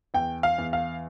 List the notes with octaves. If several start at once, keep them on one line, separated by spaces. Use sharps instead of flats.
E2 G5
F5
E2
F5